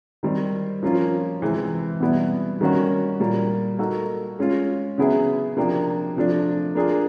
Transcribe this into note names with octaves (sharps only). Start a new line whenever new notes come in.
D#3 G3 C4
F3 A#3 C#4 F4
C3 E3 G#3 C4
B2 G3 B3 E4
D#3 G3 A#3 C#4 F#4
A#2 G3 A#3
A#3 D#4 F#4 A4
G#3 C#4 F4
C#3 F#3 B3 E4 G#4
C3 F3 A#3 D4 G4
C3 F3 A3 D4
A#3 D4 F4 G#4